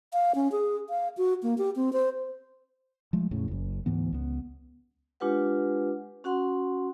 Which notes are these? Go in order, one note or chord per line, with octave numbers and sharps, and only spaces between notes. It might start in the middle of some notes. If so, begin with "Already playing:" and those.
F5
C#4
G#4
F5
F#4
A#3
G4
C4
C5
F3 G#3 A3
E2 A2 C#3
F#1 F#2
D2 G#2 E3 B3
C#2 B3
G#3 D4 F4 G4 B4 F#5
C#4 F#4 F#5 C6